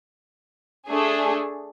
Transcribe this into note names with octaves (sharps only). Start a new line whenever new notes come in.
A3 D4 G#4